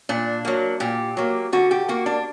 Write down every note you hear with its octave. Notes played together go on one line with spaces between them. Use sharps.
A#2 D4
F#3 A#3
A#2 G4
F#3 A#3
D3 F#4
G4
A#3 F#4
D4